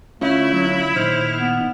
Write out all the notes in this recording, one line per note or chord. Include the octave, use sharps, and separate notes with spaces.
D3 A3 C#4 E4 F4
F#3
A#2 D#3 D#4 C5 F6
B3